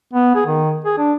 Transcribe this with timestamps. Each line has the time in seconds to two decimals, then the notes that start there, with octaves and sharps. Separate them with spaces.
0.13 B3
0.35 G#4
0.46 D#3
0.84 G#4
0.98 D4